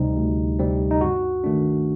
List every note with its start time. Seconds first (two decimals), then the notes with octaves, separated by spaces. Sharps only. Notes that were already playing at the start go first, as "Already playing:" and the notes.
Already playing: D2 C3 G3 C4 D#4
0.17 D2
0.59 C3 G3 C4
0.91 D#4
1.01 G2 F#4
1.44 D#3 A3 D4